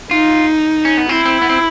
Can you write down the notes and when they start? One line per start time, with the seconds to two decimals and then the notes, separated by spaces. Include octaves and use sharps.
0.11 D#4 F4
0.85 C#4
0.97 B3
1.09 C4 E4
1.25 C4
1.42 B3
1.49 C4